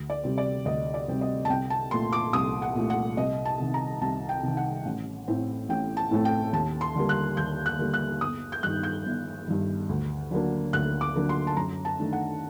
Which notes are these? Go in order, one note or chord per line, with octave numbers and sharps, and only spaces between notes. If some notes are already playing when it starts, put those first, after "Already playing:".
Already playing: D2
D5
C3 G3 C4
D5
D2 D#5
D5
C3 G3 C4
D#5
A5
C2 G5
A5
A#2 A3 C6
D6
C2 D#6
F#5
A#2 A3
F#5
C2 D#5
A5
C3 D#3
A#5
C2 A5
G5
C3 D#3
F#5
A1
A2 A3 C4
A1 G5
A5
A2 A3 C4
G5
D#2 A5
C6
D3 G3 A#3
F#6
D#2 G6
F#6
D3 G3 A#3
F#6
G1 D#6
G6
G2 D#3 F#6
G6
G1
G2 D#3
D2
D3 F#3 A#3 D4
D2 F#6
D6
D3 F#3 A#3 D4
C6
A5
F#2 A#5
A5
D#3 A3 D4
F#5